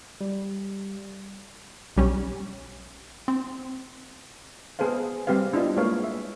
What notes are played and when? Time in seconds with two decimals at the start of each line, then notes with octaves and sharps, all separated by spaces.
0.21 G3
1.96 B1 G3 C#4
3.28 C4
4.79 B3 G#4 A4 C5 F5
5.27 G3 C4 G4 B4 F5
5.52 B3 D4 E4 F4 D#5
5.77 G#3 A#3 G#4 B4 C#5 F5
6.03 E5